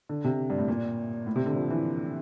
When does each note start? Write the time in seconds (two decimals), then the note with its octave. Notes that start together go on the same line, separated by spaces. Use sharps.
0.09 D3
0.24 C3
0.50 G2
0.58 A2
0.68 A#2
1.27 A2
1.36 C3
1.46 D3
1.56 F3
1.70 E3